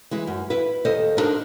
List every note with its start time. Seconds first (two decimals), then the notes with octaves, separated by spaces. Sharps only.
0.11 E3 G#3 E4
0.27 F#2
0.50 E4 B4
0.85 D#2 A4 C5 D#5
1.17 B3 D4 D#4 A#4 C5